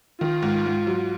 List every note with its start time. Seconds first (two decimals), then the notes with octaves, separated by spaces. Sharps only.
0.20 D#3 F4
0.42 G#2
0.66 G#2
0.87 F#3